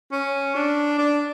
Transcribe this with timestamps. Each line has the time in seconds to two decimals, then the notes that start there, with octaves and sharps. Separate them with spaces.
0.12 C#4
0.55 D4
0.99 D4